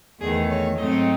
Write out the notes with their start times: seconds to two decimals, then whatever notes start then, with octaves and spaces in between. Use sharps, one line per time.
0.21 E2 D#3 A3 G#4
0.49 C#5
0.78 G#2 F#3 A3 C4 D#4 D#5